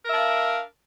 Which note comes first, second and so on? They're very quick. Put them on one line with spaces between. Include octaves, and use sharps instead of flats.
A#4 E5 D4 F5